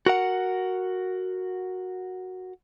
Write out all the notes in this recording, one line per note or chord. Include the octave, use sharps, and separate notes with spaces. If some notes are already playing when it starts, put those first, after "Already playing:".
F#4 A#4 F#5